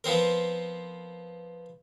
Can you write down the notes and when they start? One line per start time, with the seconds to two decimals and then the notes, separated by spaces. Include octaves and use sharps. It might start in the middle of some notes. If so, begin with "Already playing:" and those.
0.04 F3 B3 C4 A#4